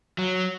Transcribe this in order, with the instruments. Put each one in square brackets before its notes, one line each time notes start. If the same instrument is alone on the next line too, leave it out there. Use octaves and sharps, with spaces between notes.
[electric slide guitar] F#3